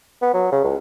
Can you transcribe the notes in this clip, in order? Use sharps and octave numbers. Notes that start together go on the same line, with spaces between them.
B3
F#3
C#3
C#2